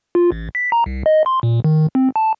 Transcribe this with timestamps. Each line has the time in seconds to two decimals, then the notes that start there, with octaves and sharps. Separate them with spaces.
0.15 F4
0.32 A1
0.55 B6
0.72 A#5
0.86 C2
1.06 D#5
1.26 C6
1.43 A#2
1.64 D#3
1.95 C4
2.16 A5